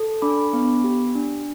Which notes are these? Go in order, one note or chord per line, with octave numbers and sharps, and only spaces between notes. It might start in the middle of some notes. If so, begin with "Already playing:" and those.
Already playing: A4
D4 B5 D6
B3
G4
D4